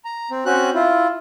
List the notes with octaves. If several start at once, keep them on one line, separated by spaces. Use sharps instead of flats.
A#5
C4
C4 C#4 F#4 F#6
E4 F4